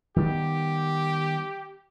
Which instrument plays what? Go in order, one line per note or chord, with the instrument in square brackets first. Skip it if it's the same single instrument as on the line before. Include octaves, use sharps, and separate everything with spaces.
[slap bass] D#3 G3 B3 [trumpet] G4